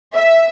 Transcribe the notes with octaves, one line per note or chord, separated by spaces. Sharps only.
E5